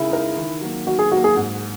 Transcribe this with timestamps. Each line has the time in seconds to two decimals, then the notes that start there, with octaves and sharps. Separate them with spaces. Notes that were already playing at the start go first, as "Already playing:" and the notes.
Already playing: C#3 G#3 D#4 E4 A#4
0.11 G#3 D#4 A#4
0.37 D#3
0.61 F#3 A#3
0.87 D#3 F#4
0.99 G#4
1.12 F#3 A#3 F#4
1.24 G#4
1.37 G#2